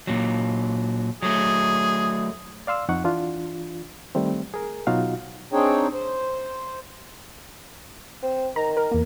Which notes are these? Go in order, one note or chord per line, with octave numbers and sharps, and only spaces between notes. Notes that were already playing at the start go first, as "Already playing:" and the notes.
A#2 F#3
F#3 A3 G#4
D5 F5 C6 E6
F2 D#4 F#5 C#6
E3 D4 F4
D#3 G3 A3 C4
G#4 A#4
B2 F#3 D#4 F4 F#4 F5
C4 D4 D#4 G#4 C#5 G5
C5
C4
D#3 A#5
A#4
E2 A#3